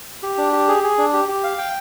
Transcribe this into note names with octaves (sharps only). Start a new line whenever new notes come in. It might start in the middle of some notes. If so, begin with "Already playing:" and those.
G4
D4
G4
G#4
G#4
D4
G4
G4
F5
G5